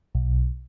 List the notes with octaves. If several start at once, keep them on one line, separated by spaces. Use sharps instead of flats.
B1